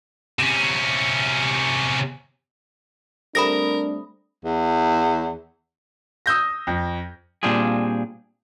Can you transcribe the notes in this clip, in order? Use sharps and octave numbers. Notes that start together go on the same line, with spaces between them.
C3 C#4
G3 A3 C4 D4 A#4 B5 D#6 A#6
E2
D#6 E6 G6 A#6
F2
A#2 G3 C4 D4 F4 G#4